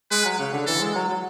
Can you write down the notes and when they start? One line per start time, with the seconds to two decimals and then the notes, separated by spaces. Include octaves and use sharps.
0.11 G#3 B4
0.25 F#3
0.39 C#3
0.53 D3
0.66 E3 A4
0.80 G#3
0.95 F#3
1.09 F#3